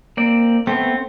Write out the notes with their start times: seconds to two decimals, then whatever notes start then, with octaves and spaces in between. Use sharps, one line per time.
0.17 A#3 C4 D5
0.67 A3 B3 C4